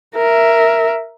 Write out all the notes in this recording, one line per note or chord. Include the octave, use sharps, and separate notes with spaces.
A#4 E5